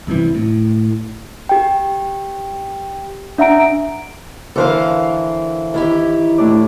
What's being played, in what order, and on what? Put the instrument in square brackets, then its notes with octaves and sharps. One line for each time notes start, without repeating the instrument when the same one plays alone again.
[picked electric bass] D2 G2 C3 E3
A2
[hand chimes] G4 G5
D4 E5 F#5 A#5 D7
[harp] D3 E3 C5 [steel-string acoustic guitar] A4 A#4 F5
[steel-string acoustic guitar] D#3 E4 G4
[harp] A2 D4 D5